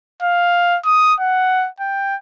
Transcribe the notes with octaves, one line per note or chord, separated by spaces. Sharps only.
F5
D#6
F#5
G5